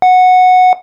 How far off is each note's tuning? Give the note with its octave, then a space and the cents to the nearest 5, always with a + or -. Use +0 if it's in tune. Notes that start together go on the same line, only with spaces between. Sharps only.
F#5 -10